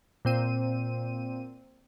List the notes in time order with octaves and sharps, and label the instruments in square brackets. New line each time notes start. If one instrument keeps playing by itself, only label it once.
[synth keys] A#2 C4 D#7